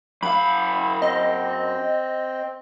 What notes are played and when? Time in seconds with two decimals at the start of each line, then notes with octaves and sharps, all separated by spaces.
0.23 F#2 F5 B5
1.02 C4 D#5